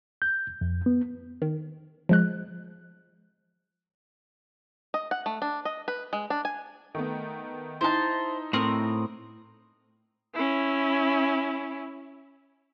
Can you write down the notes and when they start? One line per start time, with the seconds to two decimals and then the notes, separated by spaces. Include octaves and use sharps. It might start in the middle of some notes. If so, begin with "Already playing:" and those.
0.22 G6
0.61 F2
0.86 B3
1.42 D#3
2.09 F3 G#3 F#6
4.94 D#5
5.11 F#5
5.26 A3
5.42 D4
5.65 D#5
5.88 B4
6.13 G#3
6.30 D4
6.45 G#5
6.95 D#3 A3 B3
7.81 D#4 E4 C5 A5
8.53 A2 C4 A#4 D#6
10.34 C#4 E4